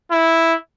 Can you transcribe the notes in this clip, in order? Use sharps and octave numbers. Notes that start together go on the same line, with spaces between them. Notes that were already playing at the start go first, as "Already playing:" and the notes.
E4